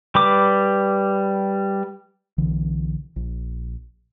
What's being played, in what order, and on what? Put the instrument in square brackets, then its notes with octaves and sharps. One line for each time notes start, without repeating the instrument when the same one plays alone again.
[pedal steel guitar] G3 B4 D6
[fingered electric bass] B1 D3 E3
A#1